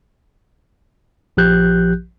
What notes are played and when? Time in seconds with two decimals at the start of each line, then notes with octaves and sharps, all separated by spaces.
1.37 A#1 F3 G4 F#6 G6